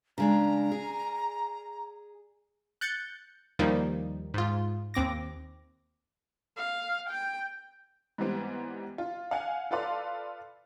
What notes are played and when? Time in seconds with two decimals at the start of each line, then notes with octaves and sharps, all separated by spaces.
0.18 C#3 G#3 D4 A#5
0.72 G#4
2.81 F#6 G6 A6 C#7
3.59 D#2 D#3 F3 G3 A#3 D#4
4.34 G#2 F4
4.94 D#2 C4 D6 A#6
6.57 F5
7.10 G5
8.18 G#2 E3 G3 B3 C4
8.98 F4
9.31 F5 F#5 G#5 C#7
9.71 F4 A4 B4 D5 F5 C6